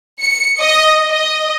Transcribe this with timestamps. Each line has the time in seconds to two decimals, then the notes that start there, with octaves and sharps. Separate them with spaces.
0.21 C#7
0.60 D#5
1.07 D#5